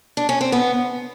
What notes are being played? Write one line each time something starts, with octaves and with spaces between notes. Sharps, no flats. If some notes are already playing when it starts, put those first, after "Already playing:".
D4
C#4
C4
B3